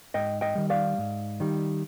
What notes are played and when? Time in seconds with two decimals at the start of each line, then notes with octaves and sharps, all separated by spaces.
0.14 G#2 D#5 G5
0.41 D#5 G5
0.55 D#3 G3
0.70 D5 F5
0.98 G#2
1.40 D#3 G3